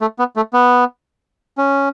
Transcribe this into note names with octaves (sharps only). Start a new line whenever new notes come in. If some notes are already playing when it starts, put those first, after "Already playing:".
A3
B3
A3
B3
C#4